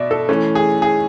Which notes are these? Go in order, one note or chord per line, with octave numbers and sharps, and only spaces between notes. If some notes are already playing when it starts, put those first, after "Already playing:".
Already playing: B2 D5 E5
A4
E3 A3 C#4
G#4
G#4